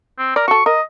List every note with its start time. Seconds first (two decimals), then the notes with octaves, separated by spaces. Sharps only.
0.18 C4
0.36 A#4 D5
0.48 F#4 A4 C#6
0.66 A#4 D#5